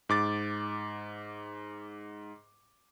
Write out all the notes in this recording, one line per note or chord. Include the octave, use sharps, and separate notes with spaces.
G#2 D6 A6